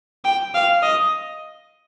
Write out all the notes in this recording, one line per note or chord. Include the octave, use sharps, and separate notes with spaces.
G5
F5
D#5